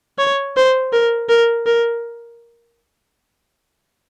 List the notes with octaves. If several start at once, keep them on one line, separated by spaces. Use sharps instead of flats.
C#5
C5
A#4
A#4
A#4